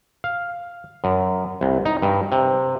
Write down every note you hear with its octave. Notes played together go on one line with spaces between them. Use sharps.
F5
F#2
C2
D#4
G2
C3